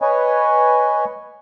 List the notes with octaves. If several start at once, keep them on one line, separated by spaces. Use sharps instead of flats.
B4 C#5 D#5 G#5